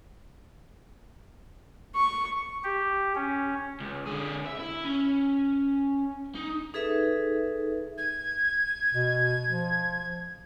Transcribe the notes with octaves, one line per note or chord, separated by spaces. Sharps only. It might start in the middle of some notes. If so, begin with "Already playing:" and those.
C#6
G4
C#4
C#2
D3 G#4
E5
E4
C#4
D#4
D#4 G#4 A4 B4 E5
G#6
B2
F3